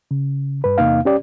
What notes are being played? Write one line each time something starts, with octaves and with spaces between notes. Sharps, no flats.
C#3
G2 B4
E2 C3 A#3 D#4 F5
C#4 G4 D5